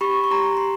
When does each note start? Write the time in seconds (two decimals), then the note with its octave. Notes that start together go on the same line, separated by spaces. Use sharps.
0.01 G4 B5 C#6
0.24 C#6
0.31 G4 A#5 C6
0.57 C6